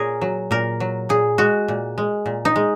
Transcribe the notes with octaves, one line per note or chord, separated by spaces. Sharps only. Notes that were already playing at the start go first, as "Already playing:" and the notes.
Already playing: A#2 G#4 A#4 C#5
F#3
A#2 A#4
F#3
A#2 G#4
G#3 F#4
A#2
G#3
A#2
D#4
G#3